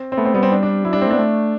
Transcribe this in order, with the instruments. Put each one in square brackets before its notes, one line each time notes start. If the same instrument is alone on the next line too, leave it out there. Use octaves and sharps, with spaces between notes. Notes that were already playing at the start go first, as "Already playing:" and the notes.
Already playing: [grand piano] C4
C4
[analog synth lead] A3 [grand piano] B3
[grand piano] C4
[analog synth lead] G3 [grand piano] B3
[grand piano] C4
D4
D4
[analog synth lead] F#3 [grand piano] E4
[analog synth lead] G3 [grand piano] D4
[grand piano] C4
[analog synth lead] A3
[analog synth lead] B3 [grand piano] D4
[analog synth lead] A3